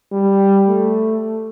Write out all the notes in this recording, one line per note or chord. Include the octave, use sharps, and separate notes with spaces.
G3
A3